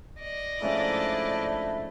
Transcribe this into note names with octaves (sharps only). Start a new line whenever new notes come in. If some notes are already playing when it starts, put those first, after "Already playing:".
D5 D#5
G#2 F3 A3 C#4 D4 E4